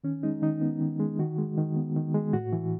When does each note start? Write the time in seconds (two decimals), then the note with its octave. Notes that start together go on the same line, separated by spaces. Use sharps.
0.04 D#3 C#4
0.23 G#3 D#4
0.42 D#3 D#4
0.61 B3
0.80 D#3
1.00 G#3
1.19 D#3 F#4
1.38 G#3
1.58 D#3
1.76 B3
1.96 D#3
2.14 G#3
2.33 A2 F#4
2.53 E3